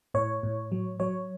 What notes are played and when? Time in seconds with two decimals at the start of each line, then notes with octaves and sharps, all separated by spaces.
0.14 A2 C#5
0.43 A2
0.72 F#3
1.00 F#3 C#5